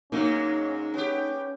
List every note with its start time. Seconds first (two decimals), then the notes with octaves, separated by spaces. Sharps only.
0.12 G#2 F#3 G#3 A#3 C#4 D#4
0.94 B3 C#4 G4